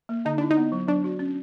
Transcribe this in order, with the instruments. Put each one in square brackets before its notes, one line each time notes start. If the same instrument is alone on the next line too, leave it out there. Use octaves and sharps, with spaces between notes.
[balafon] A#3
[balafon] D3 [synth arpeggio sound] D#4
[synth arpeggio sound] D4 [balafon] E4
[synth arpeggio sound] D#4
[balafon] B3
F#3
[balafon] F#3 [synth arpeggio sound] D4
[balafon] F#4
C#4